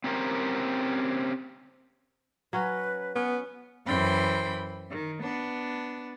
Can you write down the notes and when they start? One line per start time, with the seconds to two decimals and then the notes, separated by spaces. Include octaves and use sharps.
0.04 C4 C#4 G4 A#4 C5
2.53 F#3 C#4 F#4 B4
3.16 B3 C#4
3.86 F#2 E3 C5 G5 B5
4.90 D#3
5.21 B3 D4